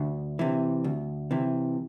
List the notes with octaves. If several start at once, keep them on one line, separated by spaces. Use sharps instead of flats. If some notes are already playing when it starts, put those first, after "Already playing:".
Already playing: D2
C3 E3
D2
C3 E3